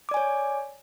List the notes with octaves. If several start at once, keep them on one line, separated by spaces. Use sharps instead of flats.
C#5 D5 G#5 D6